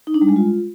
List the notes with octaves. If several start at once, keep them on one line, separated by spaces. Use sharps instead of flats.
D#4
D4
G3
G#3
F4